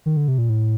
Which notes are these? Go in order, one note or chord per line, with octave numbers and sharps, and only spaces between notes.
D#3
D3
C3
A#2
A2